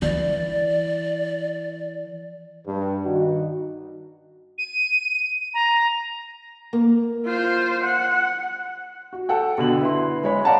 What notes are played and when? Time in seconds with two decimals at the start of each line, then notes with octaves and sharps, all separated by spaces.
0.02 E3 D5
2.67 G2
3.05 D#3 D#4 F#4
4.58 D#7
5.54 A#5
6.73 A#3
7.26 F4 C5
7.84 F#5
9.13 F#4
9.29 A4 F#5 G5
9.58 B2 D3 F#7
9.81 E4 B4 C6
10.24 G#3 C#5 B5
10.44 D5 F5 F#5 A5 A#5